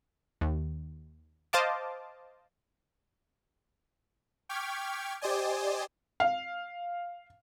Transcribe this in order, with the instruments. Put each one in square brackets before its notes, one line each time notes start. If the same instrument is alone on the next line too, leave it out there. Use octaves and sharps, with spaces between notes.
[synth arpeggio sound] D#2
C5 D#5 F5 A5 D6
[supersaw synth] G5 C#6 D6 F6 G#6 B6
G4 C5 D5 D#5 G#5
[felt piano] F5